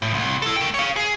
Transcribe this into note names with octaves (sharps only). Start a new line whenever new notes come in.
A2
C2
E4 A4
A3 G5
C#5 F5
G#4